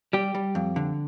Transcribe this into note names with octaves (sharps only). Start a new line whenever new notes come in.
G3 G4
G3
F2
D3